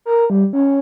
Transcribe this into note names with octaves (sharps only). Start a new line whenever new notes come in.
A#4
G3
C#4